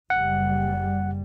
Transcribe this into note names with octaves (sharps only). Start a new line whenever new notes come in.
F#1 G3 F#5